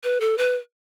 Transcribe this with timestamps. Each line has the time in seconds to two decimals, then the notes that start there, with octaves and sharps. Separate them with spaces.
0.04 B4
0.21 A4
0.38 B4